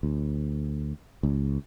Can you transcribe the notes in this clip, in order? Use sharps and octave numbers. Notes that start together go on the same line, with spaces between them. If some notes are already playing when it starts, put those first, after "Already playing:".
D2
C#2